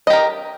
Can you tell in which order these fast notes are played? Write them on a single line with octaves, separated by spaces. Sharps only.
D#5 G4 A#4